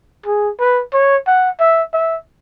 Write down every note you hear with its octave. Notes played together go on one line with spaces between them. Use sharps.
G#4
B4
C#5
F#5
E5
E5